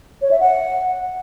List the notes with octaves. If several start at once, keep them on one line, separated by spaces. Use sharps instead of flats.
C#5
E5
F#5